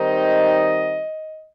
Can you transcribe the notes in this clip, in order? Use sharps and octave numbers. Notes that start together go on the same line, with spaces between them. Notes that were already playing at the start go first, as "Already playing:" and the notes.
Already playing: D#3 G3 C4 D#4 D#5